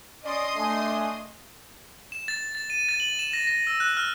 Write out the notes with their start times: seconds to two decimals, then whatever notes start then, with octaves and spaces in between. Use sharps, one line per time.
0.25 C#4 D5 D#5 C6 D#6
0.55 A3 D4 G#5
2.12 E7
2.28 A6
2.55 A6
2.70 D#7
2.89 A6
3.00 F#7
3.19 E7
3.33 A#6
3.47 A#6
3.67 E6
3.80 F#6
3.97 F6